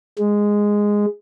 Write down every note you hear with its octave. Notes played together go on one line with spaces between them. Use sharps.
G#3